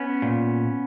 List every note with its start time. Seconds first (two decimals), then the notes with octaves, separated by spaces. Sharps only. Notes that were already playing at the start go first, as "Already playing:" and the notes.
Already playing: B3 C#4
0.22 A#2